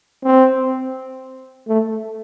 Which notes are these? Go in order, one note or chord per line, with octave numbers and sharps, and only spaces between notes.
C4
A3